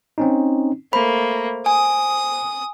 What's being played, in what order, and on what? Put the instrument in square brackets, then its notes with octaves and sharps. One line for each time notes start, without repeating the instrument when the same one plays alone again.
[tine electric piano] C4 C#4 D#4
[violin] A3 A#3 [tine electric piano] C5 [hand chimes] B5
[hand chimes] G#5 [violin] D#6